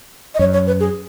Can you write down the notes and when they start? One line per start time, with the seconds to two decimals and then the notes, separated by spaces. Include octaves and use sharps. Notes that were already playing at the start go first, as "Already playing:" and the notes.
0.35 D#5
0.39 F#2 C#5
0.53 C#5
0.67 B4
0.80 G#4